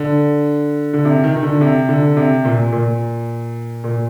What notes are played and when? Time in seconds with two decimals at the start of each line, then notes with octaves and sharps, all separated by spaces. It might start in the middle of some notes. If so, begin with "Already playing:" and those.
Already playing: D3
0.93 D3
1.05 C3
1.24 D#3
1.36 D#3
1.43 D3
1.61 C3
1.89 D3
2.17 C3
2.45 A#2
2.72 A#2
3.84 A#2